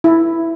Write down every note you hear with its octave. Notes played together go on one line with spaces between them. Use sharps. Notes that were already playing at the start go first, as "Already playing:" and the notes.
E4